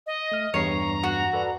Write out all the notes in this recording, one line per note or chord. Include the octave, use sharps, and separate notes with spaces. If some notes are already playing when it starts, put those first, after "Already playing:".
D#5
A3 F6
E2 G2 C#5 A#5 C7
F#4
A4 B4 D5